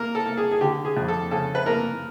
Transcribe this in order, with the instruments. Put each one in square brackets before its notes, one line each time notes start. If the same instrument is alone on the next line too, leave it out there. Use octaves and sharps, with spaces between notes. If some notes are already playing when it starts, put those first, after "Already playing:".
Already playing: [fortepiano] A#3 A#4
A4
A#3
G#4
G#4
D3 G4
G#4
F2
A4
C#3 A4
B4
A#3 A#4